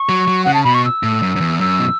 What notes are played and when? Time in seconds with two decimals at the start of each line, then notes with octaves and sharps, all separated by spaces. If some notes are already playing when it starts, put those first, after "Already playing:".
Already playing: C#6
0.09 F#3
0.28 F#3
0.44 C#3 F#5
0.54 A5
0.64 B2 B5
0.74 C#6
0.85 E6
1.03 A2
1.23 F#2
1.36 F#2
1.41 E2
1.60 F#2 E6
1.80 B2